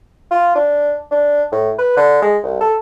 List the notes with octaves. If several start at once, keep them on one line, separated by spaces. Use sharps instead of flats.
F4
D4
D4
A2
B4
D3
G#3
C2
A4